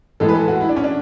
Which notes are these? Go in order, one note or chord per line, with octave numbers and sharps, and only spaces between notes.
A2 E3 G#3 A4
B4
A4
F#4
E4
D4
C#4
D4